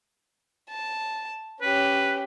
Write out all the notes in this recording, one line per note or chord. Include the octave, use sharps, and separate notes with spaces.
A5
C#4 G4 B4